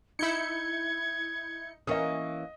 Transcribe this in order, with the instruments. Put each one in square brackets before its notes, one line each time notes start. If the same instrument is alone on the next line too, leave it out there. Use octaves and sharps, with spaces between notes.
[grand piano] D#4 [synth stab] E4 G6 C#7 [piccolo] G#6
[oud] E3 A#3 C#4 [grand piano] D#5 D#6